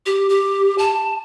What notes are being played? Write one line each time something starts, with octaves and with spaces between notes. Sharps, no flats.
G4
G4
A5